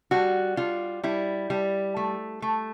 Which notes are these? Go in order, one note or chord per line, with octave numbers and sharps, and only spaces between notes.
G3 F#4
G3 F4
G3 E4
G3
A3
A3